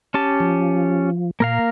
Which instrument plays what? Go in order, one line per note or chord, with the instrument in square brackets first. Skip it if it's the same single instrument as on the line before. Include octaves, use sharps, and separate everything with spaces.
[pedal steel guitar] C#4 G4 A5
[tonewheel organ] F3
[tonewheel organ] A#2 [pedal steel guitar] A#3 A#4 F5